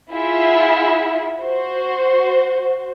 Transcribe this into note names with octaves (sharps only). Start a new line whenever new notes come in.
E4 F4 G#4 E5 F#5
F#4 C5